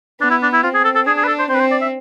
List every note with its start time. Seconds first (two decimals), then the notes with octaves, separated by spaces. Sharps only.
0.21 B3 D4
0.31 E4
0.43 D4
0.53 E4
0.63 C4 F4
0.74 G#4
0.84 A4
0.96 A4
1.07 D4 G#4
1.17 G#4
1.24 B4
1.28 A4
1.39 C5
1.49 C4 C5
1.55 B4
1.60 C5
1.71 D5
1.82 E5